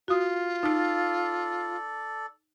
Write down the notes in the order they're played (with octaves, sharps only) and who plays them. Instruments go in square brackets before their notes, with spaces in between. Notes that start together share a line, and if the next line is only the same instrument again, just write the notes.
[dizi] F4 [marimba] F#4 D#6
[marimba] D#4 F6 [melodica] A4 D5